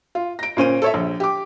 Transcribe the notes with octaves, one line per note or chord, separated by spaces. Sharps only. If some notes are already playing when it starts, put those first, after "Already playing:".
F4
A#6 D7
A#2 C#4 C5 D#7
A4 C#5 E5
A#1
G4 D6